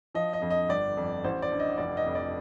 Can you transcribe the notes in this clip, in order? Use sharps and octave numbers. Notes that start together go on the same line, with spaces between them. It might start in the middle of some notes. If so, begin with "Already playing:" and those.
F3 D#5
D#5
F2
D#5
G1 D5
F2
A1 C5
D5
G2
D#5
F1 D5
D#5
F2
D5